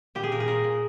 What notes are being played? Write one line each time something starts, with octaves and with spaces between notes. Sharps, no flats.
A#2 G4
G#4
A#2 A#4
G#4
A#2 A#4
A#2